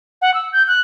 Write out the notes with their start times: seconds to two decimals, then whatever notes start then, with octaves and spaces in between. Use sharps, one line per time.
0.22 F#5
0.34 E6
0.53 G6
0.68 F#6